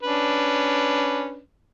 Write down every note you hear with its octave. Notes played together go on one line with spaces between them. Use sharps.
C#4 D4 B4